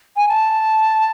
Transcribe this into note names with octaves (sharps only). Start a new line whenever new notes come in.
G#5
A5